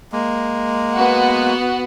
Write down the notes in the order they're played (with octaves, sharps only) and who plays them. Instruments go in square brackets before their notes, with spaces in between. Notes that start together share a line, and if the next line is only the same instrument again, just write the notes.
[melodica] G#3 A#3
[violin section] B3 F#4 F#5